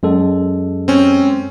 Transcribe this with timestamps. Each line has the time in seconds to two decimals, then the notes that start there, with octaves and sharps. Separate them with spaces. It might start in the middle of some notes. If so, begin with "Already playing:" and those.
0.03 F#2 G#3 A4
0.88 C4 C#4